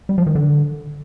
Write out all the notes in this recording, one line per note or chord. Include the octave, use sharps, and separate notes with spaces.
G3
F3
D#3
D3